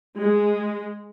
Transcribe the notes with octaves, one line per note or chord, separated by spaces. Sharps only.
G#3